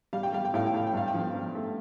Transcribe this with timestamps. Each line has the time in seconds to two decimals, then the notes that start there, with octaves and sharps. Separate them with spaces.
0.13 G3 F5
0.23 G5
0.33 G3 F5
0.45 G5
0.54 A2 F5
0.66 G5
0.74 A2 F5
0.87 G5
0.93 G2 F5
1.08 G5
1.14 F3 F5
1.34 G2
1.55 A3